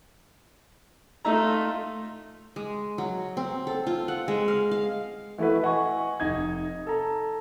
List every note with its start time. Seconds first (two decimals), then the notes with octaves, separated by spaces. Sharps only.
1.25 A3 D#4 F4 E5 A#5
2.56 G#3
2.98 F#3
3.37 C4
3.67 A4
3.87 F4
4.08 F#5
4.28 G#3
4.48 F5
4.71 F5
5.38 E3 A3 E4 F#4 B4
5.63 D#5 F#5 G#5 C#6
6.20 F1 D#4 G#6
6.87 A4 A#5